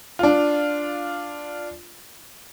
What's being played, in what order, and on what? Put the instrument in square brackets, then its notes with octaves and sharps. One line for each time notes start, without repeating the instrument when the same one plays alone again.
[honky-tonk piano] D4 F4